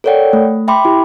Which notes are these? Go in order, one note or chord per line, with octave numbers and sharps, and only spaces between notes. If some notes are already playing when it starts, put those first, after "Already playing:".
A4 A#4 C#5 D5 F#5 G5
A3
E5 G5 B5 C6 D6
E4 G4